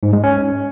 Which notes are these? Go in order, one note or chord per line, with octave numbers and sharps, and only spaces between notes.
G#2
G#3
C#4